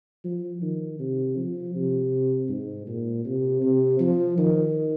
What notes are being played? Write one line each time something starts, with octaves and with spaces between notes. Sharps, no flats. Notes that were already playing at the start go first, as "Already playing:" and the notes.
F3
D#3
C3
F3
C3
G#2
A#2
C3
C3
F3
D#3